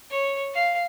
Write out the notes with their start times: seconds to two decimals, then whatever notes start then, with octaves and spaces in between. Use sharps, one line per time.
0.10 C#5
0.54 F5